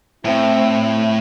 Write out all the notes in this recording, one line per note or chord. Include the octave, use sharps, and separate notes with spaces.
A2 C4 E4